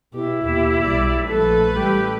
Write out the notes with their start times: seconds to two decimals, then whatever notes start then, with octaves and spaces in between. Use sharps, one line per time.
0.14 B2 E4 G4
0.43 D#2 B2 G4
0.85 B1 G3 D5
1.28 A#1 A3 A4 B4
1.74 A1 G3 G4